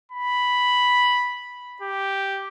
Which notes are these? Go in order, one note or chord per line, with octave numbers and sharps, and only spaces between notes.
B5
G4